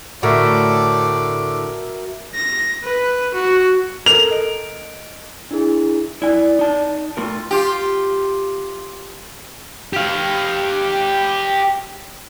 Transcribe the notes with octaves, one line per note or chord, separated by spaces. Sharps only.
A2 D3 F#4 A#4 D5 E5
A#6
B4
F#4
A4 A#4 A#5 F7
D#5 D7
D4 E4 G#4
E4 D5 G#5
D#4 A5
A3 F4 A#4
F4 G4
G4 F5